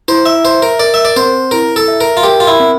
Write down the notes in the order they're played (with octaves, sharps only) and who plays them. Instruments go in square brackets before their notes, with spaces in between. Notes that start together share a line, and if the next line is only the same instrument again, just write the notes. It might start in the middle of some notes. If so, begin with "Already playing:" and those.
[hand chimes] E4 [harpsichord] C5
[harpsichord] E5
[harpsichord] C5 [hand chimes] E5
[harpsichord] A#4
[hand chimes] A#4 [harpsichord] D5
[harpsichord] E5
D5
[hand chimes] C4 [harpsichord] C5
[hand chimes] E4 [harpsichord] A#4
[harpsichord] A4
[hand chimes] E5
[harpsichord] A#4
F4
[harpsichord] G4 [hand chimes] A#4
[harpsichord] F4
E4
[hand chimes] C4